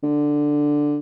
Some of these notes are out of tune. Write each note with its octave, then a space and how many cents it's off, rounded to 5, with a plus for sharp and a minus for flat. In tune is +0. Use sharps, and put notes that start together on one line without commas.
D3 +5